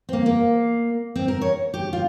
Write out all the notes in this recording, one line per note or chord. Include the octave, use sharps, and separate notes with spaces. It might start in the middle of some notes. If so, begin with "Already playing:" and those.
C4
A#3
A#3
C4
A#4
C#5
G4
F4